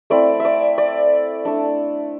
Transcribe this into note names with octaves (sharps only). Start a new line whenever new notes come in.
A3 C4 E4 D5
E5
D5
D5
A3 D4